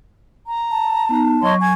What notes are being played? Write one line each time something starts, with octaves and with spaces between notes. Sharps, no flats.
A#5
A5
B3 D#4
F#3 C#5 D#5 C6 C#6
G#5 G#6